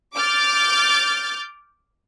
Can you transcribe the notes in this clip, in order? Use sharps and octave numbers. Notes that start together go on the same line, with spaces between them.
D6 F6 G6 A6